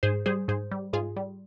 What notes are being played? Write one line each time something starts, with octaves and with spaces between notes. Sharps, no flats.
G#2 G#4 C5
G3 G#4 C5
G#2 G#4 C5
G3
G#2 F4 G#4
G3